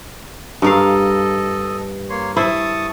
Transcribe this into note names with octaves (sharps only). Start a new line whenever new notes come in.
G2 A4 A#4 D#5 F5
A#3 C#5 C6
E4 C5 A5 C#6 D#6